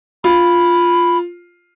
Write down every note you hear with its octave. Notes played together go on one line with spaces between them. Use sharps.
F4 B5